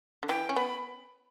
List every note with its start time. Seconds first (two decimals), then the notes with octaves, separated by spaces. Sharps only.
0.23 D3
0.29 E3 G5
0.49 C#4
0.56 B3 B5